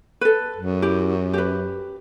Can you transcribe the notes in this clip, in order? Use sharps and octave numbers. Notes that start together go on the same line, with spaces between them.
A4 B4
F#2
E4 G4
G4 B4